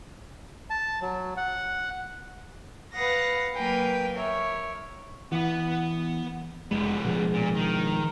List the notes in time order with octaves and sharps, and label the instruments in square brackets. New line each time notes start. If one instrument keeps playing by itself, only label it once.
[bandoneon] A5
F#3
F#5
[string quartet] B4 F5 F#5 D#6 A#6
F#3 A#3 A#4 B4 G5 G#5
A#4 C#5 E5
[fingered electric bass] E3 [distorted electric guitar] B3 F#5
[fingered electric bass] F1 G#3 [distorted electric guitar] C#2 B3
[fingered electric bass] B2 F3 G#3
[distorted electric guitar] A#2
D#3